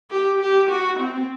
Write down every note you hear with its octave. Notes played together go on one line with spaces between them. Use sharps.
G4
G4
F#4
C4